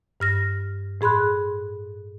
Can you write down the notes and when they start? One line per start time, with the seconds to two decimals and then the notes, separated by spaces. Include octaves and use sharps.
0.20 G2 F6 A#6
1.01 A2 G#4 B5 C6 F#6